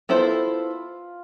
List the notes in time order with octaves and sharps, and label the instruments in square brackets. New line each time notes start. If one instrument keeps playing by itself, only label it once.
[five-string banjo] B3 E4 A4 C5 [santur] F4